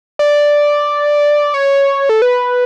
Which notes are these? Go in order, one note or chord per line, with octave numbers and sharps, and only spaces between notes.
D5
C#5
A4
B4